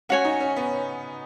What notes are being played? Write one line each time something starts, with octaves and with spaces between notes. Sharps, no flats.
C#4 F#4 C#5 G#5
D#4
C#4
B3